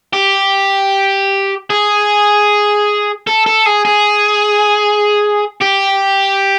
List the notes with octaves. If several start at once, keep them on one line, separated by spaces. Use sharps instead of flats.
G4
G#4
A4
A4
G#4
G#4
G4